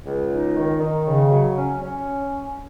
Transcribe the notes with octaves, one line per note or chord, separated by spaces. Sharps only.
C#2
D#4
D#3
D#3
C#3
F#3
C#4
C#4